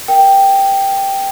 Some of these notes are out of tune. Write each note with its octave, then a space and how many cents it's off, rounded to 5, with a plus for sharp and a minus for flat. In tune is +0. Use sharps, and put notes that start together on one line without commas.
A#4 +10 G5 +0